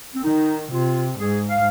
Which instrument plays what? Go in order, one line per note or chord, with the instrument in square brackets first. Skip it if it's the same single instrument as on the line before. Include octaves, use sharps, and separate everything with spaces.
[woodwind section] C4
[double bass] D#3 [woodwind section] D#4
[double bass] C3 [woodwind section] F4
[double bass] G#2 [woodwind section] G#4
[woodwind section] F5